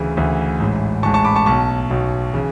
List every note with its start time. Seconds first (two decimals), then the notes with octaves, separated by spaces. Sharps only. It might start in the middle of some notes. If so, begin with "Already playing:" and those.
Already playing: D2 C#3 E3
0.17 D2 C#3 E3
0.60 A1 G#2 E3
1.03 A1 G#2 E3 A5 C#6
1.14 A5 C#6
1.25 B5 D6
1.36 A5 C#6
1.46 B1 B2 A5 C#6
1.90 B1 B2
2.34 C#3 E3